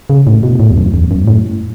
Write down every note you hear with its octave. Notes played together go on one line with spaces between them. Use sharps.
C#3
A2
B2
A2
E2
F#2
E2
F#2
G#2
A2